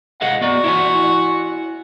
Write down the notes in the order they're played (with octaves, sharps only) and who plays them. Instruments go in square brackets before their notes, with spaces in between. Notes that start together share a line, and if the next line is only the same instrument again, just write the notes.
[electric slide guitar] G#4 D#5 F5 [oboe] F#5
[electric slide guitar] B3 D5 [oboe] F#4
[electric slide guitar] E4 C#5 G#5